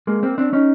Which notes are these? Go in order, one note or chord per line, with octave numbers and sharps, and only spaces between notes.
G#3 A#3
A#3 C4
C4 D4
C#4 D#4